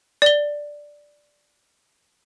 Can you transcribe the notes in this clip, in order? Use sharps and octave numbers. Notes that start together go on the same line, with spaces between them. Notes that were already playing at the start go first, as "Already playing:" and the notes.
D5 G7